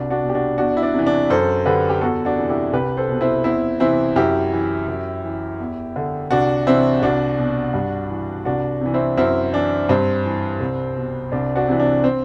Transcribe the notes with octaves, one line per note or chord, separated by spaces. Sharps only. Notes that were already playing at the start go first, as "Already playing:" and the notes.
Already playing: C2 D4 F#4
D4 F#4
B2
G4
D4 F#4
E2 D4 F#4
E4
D4
C3 E3
D4
F#2 A4 C5
D3 G4 B4
G4
E2 F#4 A4
D4 F#4
C3 E3
E4 G4
C2 G4 B4
A4 C5
B2
C4 E4
E2 C4 E4
C3 E3 C4 E4
F#2 E4 G4
E3
F#2
E3
E2
D3
C2 D4 F#4
C3 E3 C4 E4
C2 D4 F#4
B2
G2
E3
C2 D4 F#4
C3 E3
C4 E4
F#2 C4 E4
E3 D4
G2 C4
E3
C2
B2
C2 D4
D4 F#4
C3 E3
D4
C4